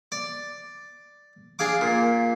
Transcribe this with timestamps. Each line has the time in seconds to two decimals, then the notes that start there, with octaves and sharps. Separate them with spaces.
0.12 D5
1.59 D4 G#4 F5 D6
1.81 A#2